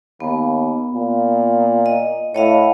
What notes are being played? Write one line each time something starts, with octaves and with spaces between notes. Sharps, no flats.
D#2 B3
A#2
D#5
A2 C#5 D#5 F5